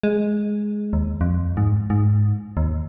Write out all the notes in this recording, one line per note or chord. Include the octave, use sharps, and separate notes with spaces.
G#3
D#2
F2
G#2
G#2
D#2